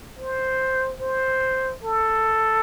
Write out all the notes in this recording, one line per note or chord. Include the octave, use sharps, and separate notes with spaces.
C5
C5
A4